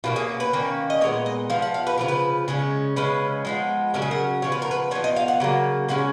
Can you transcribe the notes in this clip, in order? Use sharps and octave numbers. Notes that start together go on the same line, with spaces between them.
B2 A#3 C#4 F4
G#4
B4
D#3 A#3 C#4
D#5
A#2 G#3 B3 C#5
D#5
F3 B3 F5
F#5
F5
B4
C#3 F3 B3 A#4
B4
C#3 G#3 C#4
C#3 G#3 C#4 B4
F3 G#3 B3
C#3 F#3 C#4 A#4
G#4
A#4
C#3 F3 B3 C#5
B4
A#4
B4
F3 B3 C#5
D#5
F5
F#5
C#3 F#3 A#3
C#3 G#3 C#4 F#5